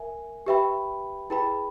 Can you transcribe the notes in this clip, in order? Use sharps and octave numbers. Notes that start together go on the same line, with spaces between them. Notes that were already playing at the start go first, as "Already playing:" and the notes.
Already playing: A#4 E5 G#5
G4 B4 E5 G5 B5
E4 G#4 B4 G5 B5